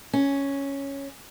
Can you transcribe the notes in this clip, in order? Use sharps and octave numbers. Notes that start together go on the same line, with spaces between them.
C#4